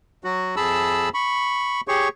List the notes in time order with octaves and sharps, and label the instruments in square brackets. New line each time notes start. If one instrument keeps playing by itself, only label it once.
[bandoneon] F#3 F#4
F2 G#4 A5 B5 E6
B5 C#6
G4 G#4 C#5 C#6